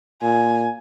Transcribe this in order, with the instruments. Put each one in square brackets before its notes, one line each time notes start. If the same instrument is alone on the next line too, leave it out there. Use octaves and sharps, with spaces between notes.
[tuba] A#2 [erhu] G#5